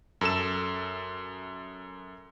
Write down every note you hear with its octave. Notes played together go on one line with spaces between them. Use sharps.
F#2 A4 E7